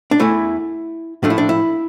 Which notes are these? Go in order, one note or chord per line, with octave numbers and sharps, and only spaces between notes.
D4
E2 E3 A3 E4
A2 F3 A3 D4
E4
D4
E4